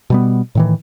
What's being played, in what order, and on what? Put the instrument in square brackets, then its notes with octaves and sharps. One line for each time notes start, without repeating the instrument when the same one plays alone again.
[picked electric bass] B2 G3 B3
A2 D#3 E3